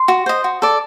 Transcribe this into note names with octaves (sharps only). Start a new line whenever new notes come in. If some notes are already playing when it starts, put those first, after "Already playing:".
Already playing: C6
F#4
C5 D#5
F#4
A4 D5